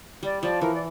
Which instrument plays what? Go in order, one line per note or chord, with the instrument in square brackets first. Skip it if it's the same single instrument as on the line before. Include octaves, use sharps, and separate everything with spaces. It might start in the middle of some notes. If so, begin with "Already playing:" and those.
[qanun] G3 [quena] D5
[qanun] F3 [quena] D5
[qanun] E3 [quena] A#4
[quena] D5